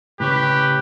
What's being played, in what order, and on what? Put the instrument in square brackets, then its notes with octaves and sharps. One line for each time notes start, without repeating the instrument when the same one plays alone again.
[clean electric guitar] A2 C#3 C#5 [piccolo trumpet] G4 [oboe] B4